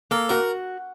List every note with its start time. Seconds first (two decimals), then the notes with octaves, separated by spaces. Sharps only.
0.11 A#3 A4
0.29 F#4 A#4